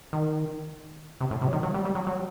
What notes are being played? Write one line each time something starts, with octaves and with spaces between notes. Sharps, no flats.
D#3
C3
A2
C3
F#3
D#3
F#3
G3
G3
F#3
F#3